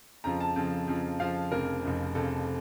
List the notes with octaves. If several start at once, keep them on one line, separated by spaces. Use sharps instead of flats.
F2 C#3 F3 A#5
A5
F2 C#3 F3
F2 C#3 F3
F2 C#3 F3 F5
F1 F2 C#3 A#4
F1 F2 C#3
F1 F2 C#3 A4